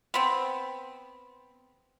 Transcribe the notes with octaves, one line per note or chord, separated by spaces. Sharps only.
B3 C4